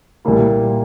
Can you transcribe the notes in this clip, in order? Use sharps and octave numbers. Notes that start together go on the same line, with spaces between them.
A#2 G3 A#3 E4